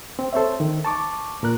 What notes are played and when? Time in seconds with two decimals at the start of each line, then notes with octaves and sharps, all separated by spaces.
0.19 C4
0.33 A4 C5 C#5 E5
0.60 D#3
0.85 A5 C#6 D6
1.43 A#2 A#4 F#6